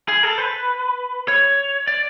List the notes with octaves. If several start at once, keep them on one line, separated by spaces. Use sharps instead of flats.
G#4
A4
B4
C#5
D5